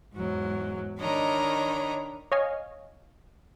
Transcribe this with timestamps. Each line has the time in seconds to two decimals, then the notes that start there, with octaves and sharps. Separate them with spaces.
0.14 E2 G#2 F#3
0.99 D#3 D4 C#5 D#5 A#5 B5
2.32 C#5 D#5 F5 G#5